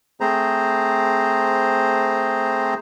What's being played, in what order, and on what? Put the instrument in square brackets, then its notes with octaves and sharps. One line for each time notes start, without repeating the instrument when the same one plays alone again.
[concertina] A3 C4 G#4 C5 A#5